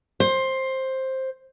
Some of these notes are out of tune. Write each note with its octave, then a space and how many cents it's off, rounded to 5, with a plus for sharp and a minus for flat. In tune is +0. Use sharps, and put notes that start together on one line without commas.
C5 +10